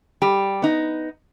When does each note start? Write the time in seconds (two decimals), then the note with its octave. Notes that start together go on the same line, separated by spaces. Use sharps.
0.22 G3 G4
0.62 B3 D#4